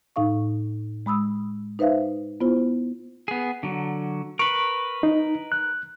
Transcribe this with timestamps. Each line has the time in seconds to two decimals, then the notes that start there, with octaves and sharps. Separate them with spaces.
0.16 A2 D#4 F5 C#6
1.06 G#3 B5 D#6 E6
1.79 D#4 B4 C5 E5 F5
2.40 B3 E4 F4 C5
3.28 B3 G#4
3.63 D3 F#3
4.39 A#4 B4 C#6
5.03 D#4
5.52 F#6